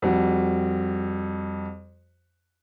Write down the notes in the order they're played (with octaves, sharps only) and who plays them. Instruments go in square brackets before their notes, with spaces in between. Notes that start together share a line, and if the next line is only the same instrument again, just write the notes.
[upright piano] F2 G3 F#4